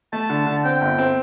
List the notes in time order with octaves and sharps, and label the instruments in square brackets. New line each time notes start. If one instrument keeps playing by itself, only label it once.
[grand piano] A3 [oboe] A5
[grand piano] D3
D3
[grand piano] C4 [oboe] G5
[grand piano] G1
C4